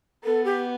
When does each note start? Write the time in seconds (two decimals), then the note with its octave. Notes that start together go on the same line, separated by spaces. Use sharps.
0.24 B3 A4
0.44 G4